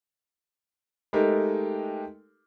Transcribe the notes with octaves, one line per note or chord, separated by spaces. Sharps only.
G#3 A3 D#4 G4 A4 A#4